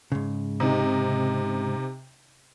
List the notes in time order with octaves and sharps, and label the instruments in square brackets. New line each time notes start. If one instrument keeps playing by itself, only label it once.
[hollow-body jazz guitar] G#2 C#3
[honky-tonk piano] C3 D#4